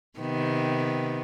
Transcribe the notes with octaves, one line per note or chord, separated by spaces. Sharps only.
C3 D#3 B3